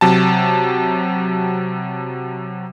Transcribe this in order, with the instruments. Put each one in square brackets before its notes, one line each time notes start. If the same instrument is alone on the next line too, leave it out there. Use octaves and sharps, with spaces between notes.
[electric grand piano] C3 F#3 A5